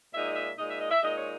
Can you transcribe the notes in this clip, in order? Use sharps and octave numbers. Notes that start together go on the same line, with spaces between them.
A#2 G#3 D#4 E5
E5
A#2 G#3 D#4 D#5
E5
D#5
E5
A#2 G#3 D#4 D#5
C#5